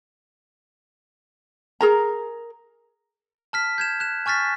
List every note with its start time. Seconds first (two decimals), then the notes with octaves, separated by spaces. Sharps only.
1.81 G#4 A#4 A#5
3.53 A5 F6 B6
3.78 G6 G#6 E7
4.00 F#6 E7
4.26 G#5 C#6 F6 A6 B6